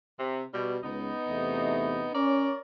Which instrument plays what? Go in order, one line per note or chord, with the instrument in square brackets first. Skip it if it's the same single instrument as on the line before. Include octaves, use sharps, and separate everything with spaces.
[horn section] C3
B2 G3
[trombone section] C#2 [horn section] B3 D#4
[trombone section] E2 C3 A3
[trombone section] C#4 [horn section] A#4 C#5 D5